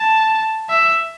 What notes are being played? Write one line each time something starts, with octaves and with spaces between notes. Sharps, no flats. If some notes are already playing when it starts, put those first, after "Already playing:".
Already playing: A5
E5